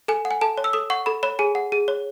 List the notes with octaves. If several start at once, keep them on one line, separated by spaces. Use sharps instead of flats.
A4 G#5
F#5
G#5
A4 A5
C#5
E6
A4 D#6
F#5 C#6
A4 B5
C#5 B5
G#4 G#5
F#5
G#4
C#5